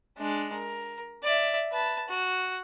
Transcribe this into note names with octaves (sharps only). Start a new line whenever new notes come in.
G#3 D4
A#4
D5 E5
B4 A5
F#4